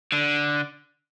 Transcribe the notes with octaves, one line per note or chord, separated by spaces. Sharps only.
D3